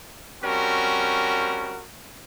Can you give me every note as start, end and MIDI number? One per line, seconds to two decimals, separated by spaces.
0.43 1.82 55
0.43 1.82 60
0.43 1.82 61
0.43 1.82 66
0.43 1.82 70